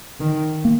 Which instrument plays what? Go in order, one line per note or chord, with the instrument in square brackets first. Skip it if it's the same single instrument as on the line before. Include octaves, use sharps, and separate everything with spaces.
[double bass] D#3
[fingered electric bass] A#3